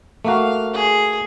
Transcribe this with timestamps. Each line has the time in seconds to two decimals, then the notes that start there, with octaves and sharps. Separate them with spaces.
0.25 A3 A#3 F#4 F5
0.73 G#4